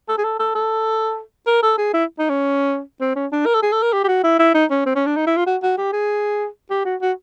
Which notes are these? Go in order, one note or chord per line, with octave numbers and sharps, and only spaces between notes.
A4
G#4
A4
A4
A4
A#4
A4
G#4
E4
D#4
C#4
C4
C#4
D4
A#4
A4
G#4
A4
A#4
G4
G4
F#4
E4
E4
D#4
C#4
C4
C#4
D4
D#4
E4
F4
F#4
F#4
G4
G#4
G4
F#4
F#4